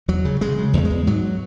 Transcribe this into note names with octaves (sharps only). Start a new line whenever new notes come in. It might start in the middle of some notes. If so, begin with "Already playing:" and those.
E2 F#3
C#3
C#3 G#3
C#3
E2 A3
G#3
E2
G#2 F#3